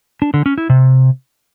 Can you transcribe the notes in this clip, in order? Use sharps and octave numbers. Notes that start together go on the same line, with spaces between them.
D4
D3
C#4
E4
C3